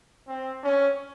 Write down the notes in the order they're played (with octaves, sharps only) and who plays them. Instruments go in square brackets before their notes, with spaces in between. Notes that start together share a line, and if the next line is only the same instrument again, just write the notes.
[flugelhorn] C4
C#4